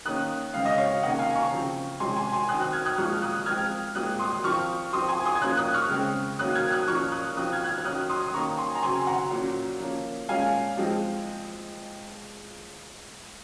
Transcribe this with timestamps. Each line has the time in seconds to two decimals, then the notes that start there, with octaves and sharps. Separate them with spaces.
0.05 D#3 A#3 C#4 D#6 F#6
0.54 C#3 G#3 C4 F5
0.65 D#5
0.78 C#5 F5
1.03 C3 D#3 A#3 C#4 D#5 F#5
1.19 F5 G#5
1.35 A#5 C#6
1.52 C#3 F3 C4
2.00 C3 F3 G#3 C#4 G#5 C6
2.16 G#5 C6
2.32 G#5 C6
2.49 D#3 F#3 C4 D#6 F#6
2.61 D#6 F#6
2.73 F6 G#6
2.86 D#6 F#6
2.98 A#2 F3 G#3 C4 C#6 F6
3.22 D#6 F#6
3.46 F3 G#3 C4 F6 G#6
3.95 A#2 G#3 C4 D#6 F#6
4.19 C6 D#6
4.44 F3 C4 C#6 F6
4.93 F3 C4 C6 D#6
5.09 G#5 C6
5.25 C6 D#6
5.35 G#6
5.41 F3 A#3 C#4 D#6 F#6
5.57 D#6 F#6
5.74 C#6 F6
5.90 C#3 G#3 C4
6.39 D#3 F#3 A#3 C#4 D#6 F#6
6.55 F6 G#6
6.72 D#6 F#6
6.88 A#2 F3 A#3 C#4 C#6 F6
7.12 D#6 F#6
7.37 F3 C4 D#6 F#6
7.53 F6 G#6
7.64 F#6
7.69 F6 G#6
7.85 D#3 F#3 C#4 D#6 F#6
8.10 C6 D#6
8.27 D#6
8.34 D#3 A#3 C#4 A#5 C#6
8.58 G#5 C6
8.75 A#5
8.83 C#3 F#3 C4 G#5 C6
9.02 C6
9.07 F#5 A#5
9.31 A#2 F#3 C#4
9.80 F3 A#3 C#4
10.29 A#2 G#3 C#4 F5 G#5
10.77 F3 G#3 C4